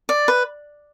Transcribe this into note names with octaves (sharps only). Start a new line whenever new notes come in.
D5
B4